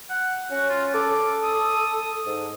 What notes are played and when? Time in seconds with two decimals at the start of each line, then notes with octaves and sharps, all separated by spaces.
0.10 F#5
0.51 C#4 F#4
0.70 F4
0.94 A4 D6
1.43 D#6
2.26 G#2